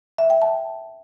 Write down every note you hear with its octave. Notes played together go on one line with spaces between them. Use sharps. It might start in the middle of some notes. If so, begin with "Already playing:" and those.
E5
G5
A5